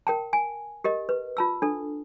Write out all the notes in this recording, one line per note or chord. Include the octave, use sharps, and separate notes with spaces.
A#4 G5 A5
G#5
G4 A#4 D#5
B4
F4 A5 E6
D4 A4